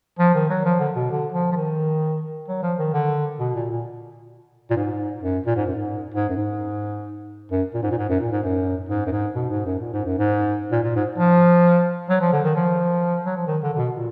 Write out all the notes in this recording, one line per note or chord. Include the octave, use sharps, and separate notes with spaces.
F3
D#3
F#3
F3
D3
B2
D3
F3
F3
D#3
F#3
F3
D#3
D3
B2
A#2
A#2
A#2
G#2
F#2
A#2
G#2
F#2
G#2
G#2
F#2
G#2
F#2
A#2
G#2
A#2
G#2
F#2
A#2
G#2
F#2
G#2
F#2
G#2
B2
G#2
F#2
A#2
G#2
F#2
G#2
A#2
A#2
G#2
F3
F#3
F3
D3
D#3
F3
F#3
F3
D#3
D3
D3
B2
A#2